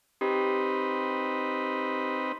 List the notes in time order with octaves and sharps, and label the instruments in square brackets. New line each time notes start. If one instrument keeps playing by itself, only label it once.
[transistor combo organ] C4 D#4 B4 [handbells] G4